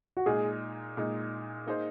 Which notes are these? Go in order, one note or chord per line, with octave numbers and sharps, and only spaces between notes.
F#4
A#2 G#3 D#4 G#4
A#2 G#3 D#4
A#3 D#4 G#4 C5